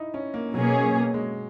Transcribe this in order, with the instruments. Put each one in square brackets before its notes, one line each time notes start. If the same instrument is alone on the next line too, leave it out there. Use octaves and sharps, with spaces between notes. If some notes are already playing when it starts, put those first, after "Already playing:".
Already playing: [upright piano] D#4 E4
C#4
A#3
[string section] B2 A#3 C#4 G#4 [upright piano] F#3
[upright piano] F#3
G#3